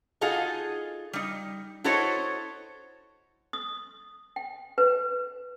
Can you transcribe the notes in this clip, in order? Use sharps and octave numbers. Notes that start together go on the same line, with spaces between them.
D#4 F4 F#4 G#4 A4 D#5
G3 D#4
E4 F#4 A4 C5 C#5 D#5
D#6
G5
B4